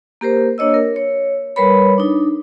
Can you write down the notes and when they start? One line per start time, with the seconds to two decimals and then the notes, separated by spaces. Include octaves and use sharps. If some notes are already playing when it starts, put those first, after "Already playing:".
0.21 A#3 G4 A#4 C5
0.58 A#3 D4 C#5 D#5 E6
0.74 A#4
0.96 C#5
1.56 G3 A#4 B4 C#5 B5
1.98 D4 D#4